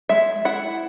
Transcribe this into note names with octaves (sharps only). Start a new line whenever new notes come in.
G#3 E5
E4 F#5